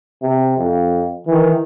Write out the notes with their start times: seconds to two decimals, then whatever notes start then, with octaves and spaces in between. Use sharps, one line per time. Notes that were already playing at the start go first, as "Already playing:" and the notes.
0.22 C3
0.57 F2
1.27 D#3 E3